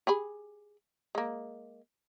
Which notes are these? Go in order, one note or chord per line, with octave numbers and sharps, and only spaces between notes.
G4 G#4 B5
G#3 A#3